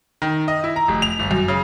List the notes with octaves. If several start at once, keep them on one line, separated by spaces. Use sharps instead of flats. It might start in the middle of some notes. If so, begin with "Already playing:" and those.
D#3
D#5
E4
A#5
F1
F7
G1
F#2
C#3